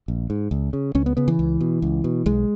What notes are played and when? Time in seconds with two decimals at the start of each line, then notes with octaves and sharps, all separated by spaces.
0.08 A#1
0.30 G#2
0.51 C#2
0.73 C#3
0.95 C#2 C#4
1.06 B3
1.17 C#3 B3
1.28 E3
1.39 C#2
1.61 B2
1.82 C#2
2.04 B2
2.26 B1 G#3